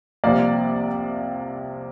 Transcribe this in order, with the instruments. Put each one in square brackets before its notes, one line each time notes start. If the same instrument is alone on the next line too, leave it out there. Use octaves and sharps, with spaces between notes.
[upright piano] C2 C3 F3 A#3 D5